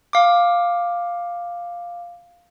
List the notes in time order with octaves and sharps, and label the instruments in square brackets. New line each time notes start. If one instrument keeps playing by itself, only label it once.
[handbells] F5 D6